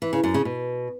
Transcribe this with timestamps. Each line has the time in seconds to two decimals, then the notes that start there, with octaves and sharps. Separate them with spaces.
0.02 E3
0.13 C#3
0.23 F#2
0.34 C#3
0.45 B2